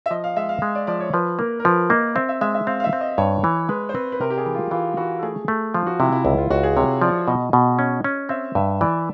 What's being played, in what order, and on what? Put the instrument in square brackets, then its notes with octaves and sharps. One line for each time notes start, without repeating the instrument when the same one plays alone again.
[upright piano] E5
[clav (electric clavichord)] F3 [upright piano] D#5
[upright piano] F5
[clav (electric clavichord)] G#3 [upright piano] E5
[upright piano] F5
[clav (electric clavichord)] G#3
[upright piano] D5
[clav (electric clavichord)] F3 [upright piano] D5
[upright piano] C#5
[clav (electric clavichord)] F3 [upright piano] B4
[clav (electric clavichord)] A#3 [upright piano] A#4
[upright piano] A#4
[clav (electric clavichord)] F3 [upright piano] B4
[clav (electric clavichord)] A#3 [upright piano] D#5
[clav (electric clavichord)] C4 [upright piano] E5
[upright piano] E5
[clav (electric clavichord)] G#3 [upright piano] E5
[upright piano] E5
[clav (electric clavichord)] C4 [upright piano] F5
[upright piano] F5
E5
[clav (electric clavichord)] C4
[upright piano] D#5
[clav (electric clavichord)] G2 [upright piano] C#5
[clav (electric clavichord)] E3
[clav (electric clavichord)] G#3 [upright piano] B4
[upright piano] C5
[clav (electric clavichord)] C4 [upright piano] B4
[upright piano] B4
[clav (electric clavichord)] C3 [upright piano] A#4
[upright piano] G4
G#4
[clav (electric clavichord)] E3
[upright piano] F4
[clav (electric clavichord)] E3 [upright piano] F4
[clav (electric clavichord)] E3 [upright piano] F#4
[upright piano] A4
[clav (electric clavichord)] A3 [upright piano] G#4
[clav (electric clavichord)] A3
[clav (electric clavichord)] F3 [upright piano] F4
[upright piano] F#4
[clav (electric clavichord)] C3 [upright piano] E4
[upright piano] E4
[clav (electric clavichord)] C#2 [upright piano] E4
[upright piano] F4
[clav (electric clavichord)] C#2 [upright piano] F#4
[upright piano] G#4
[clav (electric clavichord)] C3 [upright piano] C#5
[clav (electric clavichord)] F3 [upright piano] D5
[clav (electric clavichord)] B2 [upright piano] D#5
[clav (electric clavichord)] B2
C#4
C#4
[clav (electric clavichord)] C4 [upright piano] E5
[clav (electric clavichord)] G2 [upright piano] E5
[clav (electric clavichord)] E3 [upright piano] D5